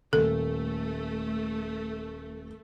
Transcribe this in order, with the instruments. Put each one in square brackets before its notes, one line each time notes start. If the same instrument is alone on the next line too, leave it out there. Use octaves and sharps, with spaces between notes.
[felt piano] D#1 [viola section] A3 [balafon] A4